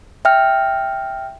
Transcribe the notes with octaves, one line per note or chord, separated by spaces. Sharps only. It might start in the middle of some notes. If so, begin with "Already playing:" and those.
E5 G5 F6